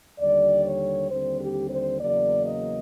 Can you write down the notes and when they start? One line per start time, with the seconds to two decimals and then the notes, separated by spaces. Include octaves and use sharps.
0.19 D#2 D3 G3 D5
0.64 C#5
1.09 D#2 D3 G3 C4 C5
1.40 G4
1.70 C5
2.00 E2 C#3 F#3 A#3 D5
2.46 D#5